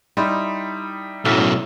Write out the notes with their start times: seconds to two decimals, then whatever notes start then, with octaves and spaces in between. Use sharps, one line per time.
0.17 G3 D#4 E4 G4 B5 C6
1.25 B1 F#2 A2 A3 F#4 E6 F6 B6